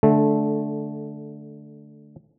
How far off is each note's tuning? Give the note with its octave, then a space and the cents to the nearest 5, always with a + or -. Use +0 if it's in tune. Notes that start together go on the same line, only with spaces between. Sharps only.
D3 +0 A3 -15